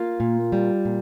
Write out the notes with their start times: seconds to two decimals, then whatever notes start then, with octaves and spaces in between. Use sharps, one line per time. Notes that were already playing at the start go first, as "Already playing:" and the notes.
Already playing: A#3 F4 F5
0.20 A#2
0.52 G3
0.85 A#2